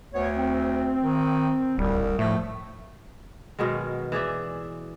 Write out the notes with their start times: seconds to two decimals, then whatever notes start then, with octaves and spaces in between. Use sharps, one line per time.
0.13 D2 B3 C#5
0.36 C4
1.04 D#3
1.78 D1 C2 G3
2.19 A2 F3 A3
3.59 B2 D#3 F#3 G#3
4.12 E3 G#4 D5 E5